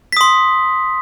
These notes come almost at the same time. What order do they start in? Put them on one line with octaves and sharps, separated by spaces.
B6 D#6 C6